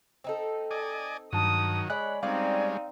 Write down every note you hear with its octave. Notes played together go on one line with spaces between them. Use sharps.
C4 D#4 A4
D5 D#5 G#5
G2 D#3 F#3 A5 D#6
G#3 C#5 D5 B5 F#6
G3 G#3 C4 C#4 D#4 D5 F5